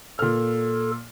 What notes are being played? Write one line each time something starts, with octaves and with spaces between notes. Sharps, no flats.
A#2 A4 F6